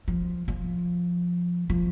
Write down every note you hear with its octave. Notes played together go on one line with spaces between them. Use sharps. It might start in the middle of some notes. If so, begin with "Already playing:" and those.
F3
F3
F3